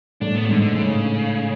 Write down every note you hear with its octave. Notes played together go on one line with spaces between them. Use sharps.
A2 D4
B3
C#3
G#2 D3
D3
A2 C#3